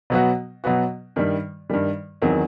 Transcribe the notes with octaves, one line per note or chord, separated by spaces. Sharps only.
B2 F#3 B3 F#4
B2 F#3 B3 F#4
G2 D#3 G3
G2 D#3 G3
E2 D#3 F#3 C4